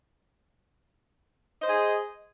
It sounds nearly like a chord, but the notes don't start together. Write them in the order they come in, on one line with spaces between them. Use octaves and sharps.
D#5 C5 G#4